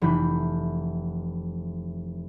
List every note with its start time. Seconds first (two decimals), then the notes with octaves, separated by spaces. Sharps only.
0.02 F1 E3 B5 G6